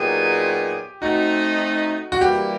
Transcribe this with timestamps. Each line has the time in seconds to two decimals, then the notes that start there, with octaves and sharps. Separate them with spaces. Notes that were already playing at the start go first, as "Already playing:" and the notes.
Already playing: A#2 F#3 B3 D#4 G4 G#4
1.02 A3 C4 D#4 F#4
2.12 F#4
2.20 E3 G3 A#3 G4